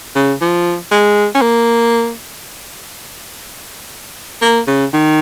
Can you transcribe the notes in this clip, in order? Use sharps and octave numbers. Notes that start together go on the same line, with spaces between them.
C#3
F3
G#3
C#4
A#3
A#3
C#3
D#3